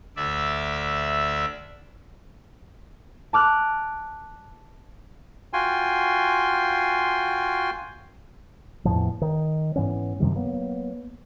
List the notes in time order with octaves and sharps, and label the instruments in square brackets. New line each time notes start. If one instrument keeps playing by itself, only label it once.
[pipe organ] D2 D5 E5
[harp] A5 D6 F6 F#6
[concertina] F4 F#4 G5 G#5 C6
[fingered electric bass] E2 A2 F3
D#3
G#2 E3 B3 C#4
F#2 C3 D#3 G3
F#3 A#3 B3